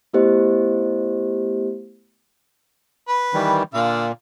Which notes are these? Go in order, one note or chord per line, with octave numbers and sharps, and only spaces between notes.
A3 B3 E4 G4 C5 D#5
B4
D#3 E3 G3
A#2 D3 F5